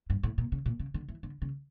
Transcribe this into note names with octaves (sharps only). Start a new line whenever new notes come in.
G2
A2
A#2
C#3
A#2
C#3
D3
E3
D3
C#3